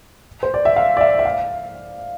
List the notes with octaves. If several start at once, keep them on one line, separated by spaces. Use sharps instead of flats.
C5
D5
E5
F5
D5
E5
E5
F5